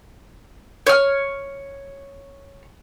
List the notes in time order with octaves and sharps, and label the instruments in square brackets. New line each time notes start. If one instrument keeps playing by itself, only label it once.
[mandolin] C#5 F6